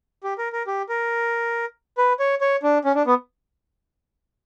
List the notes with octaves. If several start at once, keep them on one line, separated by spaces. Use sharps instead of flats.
G4
A#4
A#4
G4
A#4
B4
C#5
C#5
D4
C#4
D4
B3